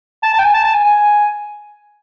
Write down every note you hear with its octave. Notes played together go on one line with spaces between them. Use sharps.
A5
A5
G5
G#5
A5
A5
G#5
G#5